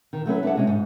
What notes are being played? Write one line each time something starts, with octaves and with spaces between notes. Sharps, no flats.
D#3
F#3 A3 C#4 B4
A3 D4 A4 F#5
C3 G#3 C#4
G#2